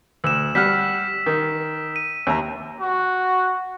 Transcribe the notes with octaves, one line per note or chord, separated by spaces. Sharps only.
D2 E6 E7
G3 F#5 F6 B6
D#3
D#7
D#2 E5 A#5
F#4